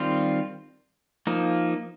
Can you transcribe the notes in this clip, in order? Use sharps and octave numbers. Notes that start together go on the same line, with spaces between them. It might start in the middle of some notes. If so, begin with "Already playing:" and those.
Already playing: D#3 G3 C4 F4
F3 A#3 D#4